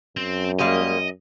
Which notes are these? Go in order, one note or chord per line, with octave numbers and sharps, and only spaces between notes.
F#2 C4
G3 G#3 A#3 D#5